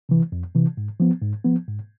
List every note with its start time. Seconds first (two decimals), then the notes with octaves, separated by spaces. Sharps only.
0.09 C3 E3
0.32 F2
0.55 C3 E3
0.77 G#2
1.00 F3 B3
1.22 G#2
1.45 F3 B3
1.68 G#2